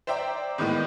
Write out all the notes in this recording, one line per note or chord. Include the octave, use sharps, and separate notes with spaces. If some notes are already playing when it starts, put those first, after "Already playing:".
C5 D5 E5 G5 A#5
A2 D#3 E3 G#3 A#3 B3